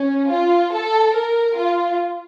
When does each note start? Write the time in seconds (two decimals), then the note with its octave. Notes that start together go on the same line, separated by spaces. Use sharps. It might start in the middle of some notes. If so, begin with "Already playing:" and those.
Already playing: C#4
0.29 F4
0.72 A4
1.14 A#4
1.57 F4